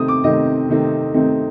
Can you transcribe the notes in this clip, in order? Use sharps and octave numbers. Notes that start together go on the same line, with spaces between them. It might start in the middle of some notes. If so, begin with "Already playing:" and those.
Already playing: C3 D#3 A3 C4 D#6
D6
C3 D#3 A3 C4 D#5
C3 D#3 A3 C4
C3 D#3 A3 C4